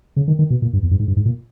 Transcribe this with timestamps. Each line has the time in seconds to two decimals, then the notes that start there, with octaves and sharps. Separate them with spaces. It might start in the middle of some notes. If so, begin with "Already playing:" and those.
0.16 C#3
0.28 D#3
0.39 D#3
0.50 B2
0.62 A#2
0.73 G2
0.83 E2
0.91 G2
1.00 G#2
1.08 G2
1.17 G#2
1.25 A#2